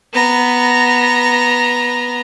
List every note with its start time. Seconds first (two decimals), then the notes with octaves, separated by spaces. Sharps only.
0.13 B3 A#5